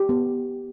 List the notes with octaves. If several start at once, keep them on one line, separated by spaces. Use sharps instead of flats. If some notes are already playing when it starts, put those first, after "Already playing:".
Already playing: G4
B3